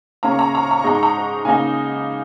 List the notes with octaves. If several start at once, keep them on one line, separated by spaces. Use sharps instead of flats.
C#3 A#3 C#4 A#5
C#6
A#5
C#6
A#5
C#6
A#5
C#6
G#2 G#3 D#4 A#5
C#6
A#5
C#3 A#3 D#4 G#5